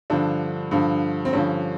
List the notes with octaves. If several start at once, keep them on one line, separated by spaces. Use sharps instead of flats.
G2 D3 F3 D4
G2 D3 F3
C4
G2 D3 F3 C#4